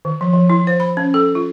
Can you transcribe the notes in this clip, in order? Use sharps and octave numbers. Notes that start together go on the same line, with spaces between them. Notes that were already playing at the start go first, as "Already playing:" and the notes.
D#3
F3
F3
E4
C5
B5
C#4
A4
F4